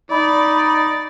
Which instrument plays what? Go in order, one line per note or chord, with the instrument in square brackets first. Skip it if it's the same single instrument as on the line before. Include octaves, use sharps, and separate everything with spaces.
[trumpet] D#4 [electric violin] D5 [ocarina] B5